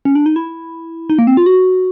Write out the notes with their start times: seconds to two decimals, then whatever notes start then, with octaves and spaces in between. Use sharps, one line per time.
0.05 C#4
0.15 D4
0.26 D#4
0.36 E4
1.10 D#4
1.19 A#3
1.27 C4
1.37 F4
1.46 F#4